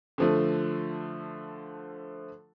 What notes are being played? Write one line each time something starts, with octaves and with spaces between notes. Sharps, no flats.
D3 F3 A3